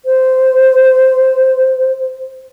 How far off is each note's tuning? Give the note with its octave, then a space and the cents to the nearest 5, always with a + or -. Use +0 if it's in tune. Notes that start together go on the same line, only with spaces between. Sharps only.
C5 -10